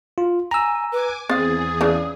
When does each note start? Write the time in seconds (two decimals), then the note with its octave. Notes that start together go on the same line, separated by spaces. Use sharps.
0.18 F4
0.51 G#5 A#5 E6
0.92 B4 G#5 D6
1.29 E2 C4 G#4 F5 D#6 A6
1.81 C#3 E3 D4